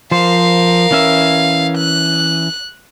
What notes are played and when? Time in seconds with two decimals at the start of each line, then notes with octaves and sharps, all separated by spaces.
0.11 F3 A#4 C5 F5
0.91 E3 C#4 E5
1.78 F#6